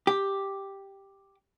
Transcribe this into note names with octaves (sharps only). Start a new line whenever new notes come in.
G4